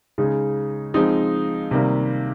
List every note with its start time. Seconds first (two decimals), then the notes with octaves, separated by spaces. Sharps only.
0.18 C#3 G#3 D#4
0.94 F3 G#3 C4 D#4
1.71 C3 D#3 G3 A#3